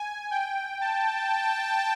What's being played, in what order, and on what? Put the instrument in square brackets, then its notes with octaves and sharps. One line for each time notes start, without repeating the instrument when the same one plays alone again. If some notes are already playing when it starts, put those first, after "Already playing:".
Already playing: [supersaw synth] G#5
G5
A5